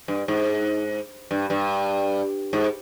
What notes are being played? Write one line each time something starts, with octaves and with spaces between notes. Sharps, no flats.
G2
G#2
G2
G2
G#2